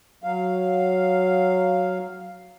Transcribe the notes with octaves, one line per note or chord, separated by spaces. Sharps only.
F#3 F5